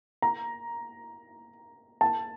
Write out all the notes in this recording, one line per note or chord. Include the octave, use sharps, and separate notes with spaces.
A#5
A5